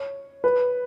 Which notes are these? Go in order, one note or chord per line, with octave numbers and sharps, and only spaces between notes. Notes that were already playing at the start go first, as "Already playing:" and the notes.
Already playing: C#5
B4